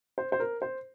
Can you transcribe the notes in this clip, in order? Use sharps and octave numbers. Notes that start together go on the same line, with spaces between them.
C5
C5
A#4
C5